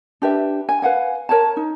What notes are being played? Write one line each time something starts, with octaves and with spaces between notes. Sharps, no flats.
D4 G4 B4 E5
G#5
B4 F5 F#5 G#5
A#4 C#5 A5
D#4